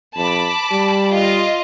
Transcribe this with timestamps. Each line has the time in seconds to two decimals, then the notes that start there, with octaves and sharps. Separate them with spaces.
0.17 F2 A5 B5 D6
0.72 G3
1.13 F4 D#5